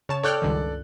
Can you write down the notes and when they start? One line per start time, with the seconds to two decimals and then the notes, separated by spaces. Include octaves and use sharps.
0.09 C#3 C#5 A5 E7
0.24 A4 C#5 D5 G5 F6 F#6
0.42 C#2 G2 D#3